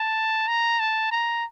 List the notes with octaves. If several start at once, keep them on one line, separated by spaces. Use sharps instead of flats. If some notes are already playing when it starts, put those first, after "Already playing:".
Already playing: A5
A#5
A5
A#5